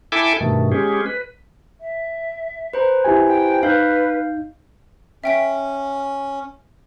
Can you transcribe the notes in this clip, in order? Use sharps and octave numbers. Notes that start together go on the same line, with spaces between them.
E4 A4 E5 G5 G#5 D6
G2 B2 D#3 A3
G#3 C#4 G4 G#4
B4
E5
B4 C5 A#5
E4 G4 G#5
G5
D#4 B4 F5 G6
C#4 E5 G5 B6